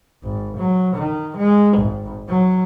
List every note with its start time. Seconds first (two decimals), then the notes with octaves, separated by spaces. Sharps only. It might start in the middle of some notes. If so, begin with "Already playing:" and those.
0.23 G#1
0.57 F#3
0.95 D#3
1.36 G#3
1.77 G#1
2.28 F#3